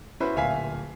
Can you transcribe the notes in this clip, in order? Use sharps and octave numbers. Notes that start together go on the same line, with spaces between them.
C#4 E4 F#4 B4 C5
D1 A#2 E5 F5 G#5 B6